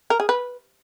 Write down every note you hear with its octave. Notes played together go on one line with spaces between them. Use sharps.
A#4
G#4
B4